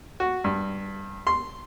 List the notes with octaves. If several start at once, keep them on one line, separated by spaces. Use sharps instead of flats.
F#4
G2
C6